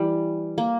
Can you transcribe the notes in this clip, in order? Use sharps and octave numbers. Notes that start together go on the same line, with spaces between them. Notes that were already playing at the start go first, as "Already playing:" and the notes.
Already playing: E3 G3
A#3